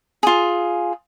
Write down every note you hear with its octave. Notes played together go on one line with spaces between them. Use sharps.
F4 G#4